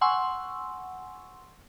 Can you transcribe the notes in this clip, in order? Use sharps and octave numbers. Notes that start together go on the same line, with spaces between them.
F#5 G#5 C6 C#6 E6